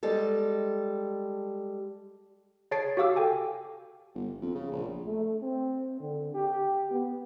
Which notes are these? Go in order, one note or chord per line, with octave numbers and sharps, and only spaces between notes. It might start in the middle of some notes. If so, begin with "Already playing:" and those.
G3 G#3 A4
G#4 C#5 A5 A6 C7 D7
F#4 G4 F5 D6 E6
A4 G5 G#5
G1
F2
C#3
A#1
A3
C4
D3
G4
B3